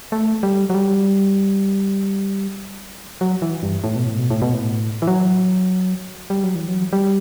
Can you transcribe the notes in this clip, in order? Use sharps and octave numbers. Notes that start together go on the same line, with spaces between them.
A3
G3
F#3
G3
F#3
E3
G2
A2
B2
A2
B2
A2
B2
A2
E3
F#3
G3
F#3
E3
F#3
G3